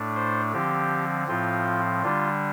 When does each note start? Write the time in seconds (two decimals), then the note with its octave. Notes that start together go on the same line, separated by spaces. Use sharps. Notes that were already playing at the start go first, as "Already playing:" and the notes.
Already playing: A2 A3 D4
0.15 C5
0.53 D3 F3 C4 G4
1.28 A2 F3 C4 F4
2.03 D3 G3 D4 F4